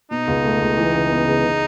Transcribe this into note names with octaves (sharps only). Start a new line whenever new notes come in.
B2 D#4
C#2
A3
C#2
E3
C#3
B3
C#3
C#3